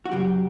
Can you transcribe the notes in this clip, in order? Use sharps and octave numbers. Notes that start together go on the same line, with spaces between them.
F#4
F#2 C#3 F#3 G4